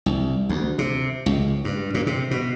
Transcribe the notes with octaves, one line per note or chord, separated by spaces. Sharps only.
C2
D2
C3
C#2
G2
A#2
C3
B2